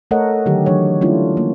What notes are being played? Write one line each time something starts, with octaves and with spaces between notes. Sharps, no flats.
A3 A4 A#4 C#5 D#5 F#5
D3 D#3 F#3 G4
E3 F#3 D4 C#5
G3 A3 C#4 D4 E4 F4
A#3